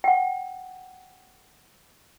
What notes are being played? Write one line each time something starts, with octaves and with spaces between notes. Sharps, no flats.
F#5 G5